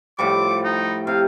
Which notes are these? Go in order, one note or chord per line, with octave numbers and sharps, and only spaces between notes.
A2 F3 G3 D6
D#4
C3 F5